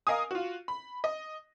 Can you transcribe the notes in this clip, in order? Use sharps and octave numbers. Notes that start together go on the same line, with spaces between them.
A#4 D#5 F5 G#5 D#6
F4 F#4
B5
D#5